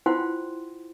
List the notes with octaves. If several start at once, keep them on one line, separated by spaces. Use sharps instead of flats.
E4 F4 C5 F#5 G5 C6